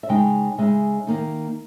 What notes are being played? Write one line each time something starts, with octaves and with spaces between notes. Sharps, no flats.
E5
C#3 G#3 D#4 G5
C#3 G#3 D#4 E5
D#3 A#3 D#4